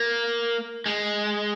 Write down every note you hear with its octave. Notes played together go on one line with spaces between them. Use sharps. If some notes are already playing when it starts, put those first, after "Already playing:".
Already playing: A#3
G#3